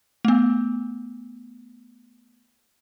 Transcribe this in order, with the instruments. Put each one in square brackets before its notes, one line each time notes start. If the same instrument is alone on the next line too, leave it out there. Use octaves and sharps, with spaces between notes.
[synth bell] A3 B3